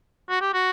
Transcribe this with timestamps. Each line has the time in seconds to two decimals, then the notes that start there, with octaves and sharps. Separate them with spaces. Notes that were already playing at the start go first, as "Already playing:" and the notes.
0.30 F#4
0.41 G4
0.54 F#4